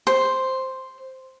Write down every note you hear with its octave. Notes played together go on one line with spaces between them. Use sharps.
C5